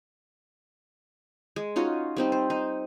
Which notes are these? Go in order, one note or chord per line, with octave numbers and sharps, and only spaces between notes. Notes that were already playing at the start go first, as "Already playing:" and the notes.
G#3
C#4 D#4 F4 F#4
G3 C4 D#4
C5
D#4